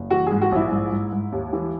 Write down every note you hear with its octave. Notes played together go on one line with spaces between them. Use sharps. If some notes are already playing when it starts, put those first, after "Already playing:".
Already playing: F#1
E3 F#4
G#2 G#4
F#4
A#1 E4
G#2
G#2
G#2
D#2
E3